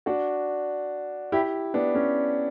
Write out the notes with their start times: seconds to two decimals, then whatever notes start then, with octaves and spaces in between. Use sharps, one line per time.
0.06 D4 F#4
1.32 E4 G4
1.74 B3 D4
1.95 C#4